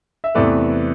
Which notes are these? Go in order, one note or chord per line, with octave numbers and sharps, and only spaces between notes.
E5
E2 C3 E3 A3 B4 D5